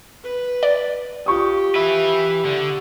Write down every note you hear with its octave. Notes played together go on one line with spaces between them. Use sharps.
B4
D5
F4 G4 C#6 D#6
B4 E5
D3